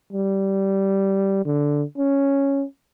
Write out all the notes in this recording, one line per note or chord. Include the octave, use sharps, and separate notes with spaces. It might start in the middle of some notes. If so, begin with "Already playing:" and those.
G3
D3
C#4